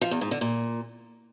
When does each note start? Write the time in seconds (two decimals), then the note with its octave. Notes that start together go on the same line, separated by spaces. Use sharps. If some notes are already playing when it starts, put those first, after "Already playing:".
0.01 F3
0.11 E2
0.21 G#2
0.31 D3
0.41 A#2